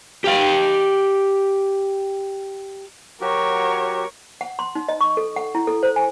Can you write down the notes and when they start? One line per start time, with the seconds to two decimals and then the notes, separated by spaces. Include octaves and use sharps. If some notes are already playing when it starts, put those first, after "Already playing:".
0.24 G4 F5
3.21 F#3 F#4 G4 A#4 C#5
4.41 F#5
4.59 C6
4.75 D#4
4.89 D#5
5.01 C#6
5.17 A4
5.36 F#5
5.55 E4
5.67 A4
5.83 C5
5.96 G#5